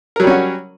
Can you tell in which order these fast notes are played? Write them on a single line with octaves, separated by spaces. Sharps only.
A#4 F#3 G3 C#4 F#4